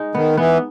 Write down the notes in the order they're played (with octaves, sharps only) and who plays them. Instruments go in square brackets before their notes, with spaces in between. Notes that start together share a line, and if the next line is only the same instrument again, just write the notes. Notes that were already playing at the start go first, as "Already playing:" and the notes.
Already playing: [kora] G#3 D#4
[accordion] D#3 [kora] B3
[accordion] E3 [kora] B3